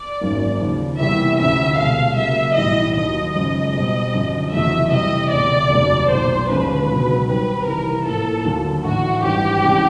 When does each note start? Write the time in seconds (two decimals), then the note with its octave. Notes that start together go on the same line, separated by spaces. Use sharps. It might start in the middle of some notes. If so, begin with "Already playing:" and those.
Already playing: D5
0.21 G#1 F#2 D#3 F#3 A#3
0.60 D#2 C#3 F3
0.99 E2 C3 E3 G3 A#3 E5
1.38 D2 C3 F3 A3 C#4 E5
1.78 C2 B2 G#3 F5
2.17 C#3 F#3 A#3 E5
2.56 B1 A2 E3 G3 D#5
2.96 D#2 D#3 F#3 D#5
3.35 F#2 C#3 F3 G#3 D#5
3.74 B2 G3 C4
4.14 F#2 D3 F3
4.52 F1 E2 C#3 F#3 A3 E5
4.92 C3 E3 G3 D#5
5.31 E1 D2 C3 D5
5.70 F1 D#2 C#3 F#3 B3
6.09 B1 A#2 F#3 C5
6.48 D#2 D3 F3 G#3 C#4 B4
6.88 C#2 B2 F#3
7.27 D#3 G3 C4 B4
7.66 C2 C3 E3 A#4
8.06 A2 F3 A#3 A4
8.44 D#2 D3 F#3 A#3
8.84 A2 E3 A3 D4 F#4
9.23 G#1 G2 E3 G4
9.63 C2 C3 E3 G#3 C#4